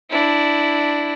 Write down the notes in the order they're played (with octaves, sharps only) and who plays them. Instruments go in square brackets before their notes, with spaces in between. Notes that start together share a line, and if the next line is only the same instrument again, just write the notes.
[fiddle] D4 E4